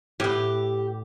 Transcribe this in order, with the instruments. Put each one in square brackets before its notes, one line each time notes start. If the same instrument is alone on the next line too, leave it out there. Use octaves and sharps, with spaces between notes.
[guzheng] A2 B3 [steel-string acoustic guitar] G4